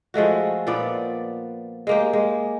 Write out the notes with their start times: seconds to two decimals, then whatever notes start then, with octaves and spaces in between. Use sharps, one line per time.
0.14 F3 G#3 A3 F#4
0.67 A#2 F3 B3 D5
1.87 G#3 A#3 G4
2.13 G#3